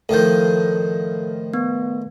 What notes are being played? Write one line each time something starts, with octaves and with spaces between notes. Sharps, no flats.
A2 D#3 F3 A4 G6
B3